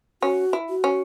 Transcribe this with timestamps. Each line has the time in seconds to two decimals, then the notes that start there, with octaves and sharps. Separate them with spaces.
0.22 C#4 F#4
0.53 E4
0.69 F#4
0.84 C#4